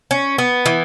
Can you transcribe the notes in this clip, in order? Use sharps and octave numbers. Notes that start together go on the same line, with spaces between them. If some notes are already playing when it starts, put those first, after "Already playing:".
C#4
B3
E3